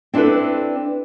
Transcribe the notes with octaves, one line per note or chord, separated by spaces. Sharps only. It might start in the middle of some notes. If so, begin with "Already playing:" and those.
C4 D4 E4 A4 B4